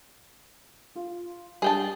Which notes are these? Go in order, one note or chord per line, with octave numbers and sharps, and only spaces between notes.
F4
G3 D4 G#4 G5 A5